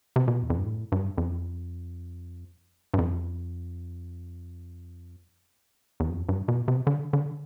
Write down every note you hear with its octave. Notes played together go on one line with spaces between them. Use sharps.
C3
B2
E2
F2
G2
A2
G2
F2
G2
F2
E2
F2
G2
B2
C3
D3
D3